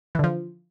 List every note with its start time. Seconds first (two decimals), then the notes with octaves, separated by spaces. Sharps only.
0.15 E3
0.19 D3
0.24 F3